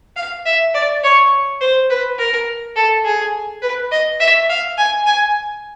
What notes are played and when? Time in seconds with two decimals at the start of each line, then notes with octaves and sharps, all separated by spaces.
0.16 F5
0.45 E5
0.74 D5
1.04 C#5
1.61 C5
1.90 B4
2.18 A#4
2.76 A4
3.05 G#4
3.62 B4
3.91 D#5
4.20 E5
4.49 F5
4.78 G#5
5.07 G#5